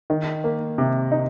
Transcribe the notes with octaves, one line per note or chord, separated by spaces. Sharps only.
D#3
A#3
C3
D#4